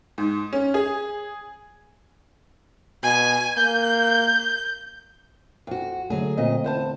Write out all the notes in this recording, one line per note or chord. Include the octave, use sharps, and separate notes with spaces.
G#2
C#4
G#4
B2 G#5
A#3 G6
F2 F#4
D3 F#3 A3 G#4
A#2 C4 D#5
E2 C5 A5